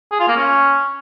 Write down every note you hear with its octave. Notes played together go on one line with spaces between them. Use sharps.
G#4
F4
A#3
C#4